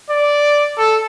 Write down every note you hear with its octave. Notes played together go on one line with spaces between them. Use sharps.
D5
A4